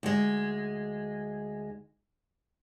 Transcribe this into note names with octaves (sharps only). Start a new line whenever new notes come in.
D2 G#3